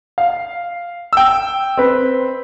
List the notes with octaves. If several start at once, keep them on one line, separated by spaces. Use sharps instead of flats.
F5
G5 E6
C4 B4